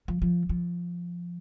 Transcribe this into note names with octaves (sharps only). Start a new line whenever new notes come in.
F3
F3
F3